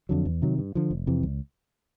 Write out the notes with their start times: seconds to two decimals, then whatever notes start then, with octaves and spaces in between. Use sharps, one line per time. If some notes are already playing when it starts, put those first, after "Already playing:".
0.09 F2 D3 F#3
0.25 E2
0.42 C3 D#3 F#3
0.59 G2
0.75 D3 F3
0.91 F1
1.07 F2 C3 E3
1.23 C#2